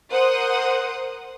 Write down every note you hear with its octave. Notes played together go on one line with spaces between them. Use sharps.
A#4 C5 F#5 D#6